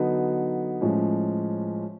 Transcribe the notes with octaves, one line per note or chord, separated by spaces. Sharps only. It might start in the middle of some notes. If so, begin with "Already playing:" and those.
Already playing: D3 F#3 B3 D#4
A2 F3 G#3 C#4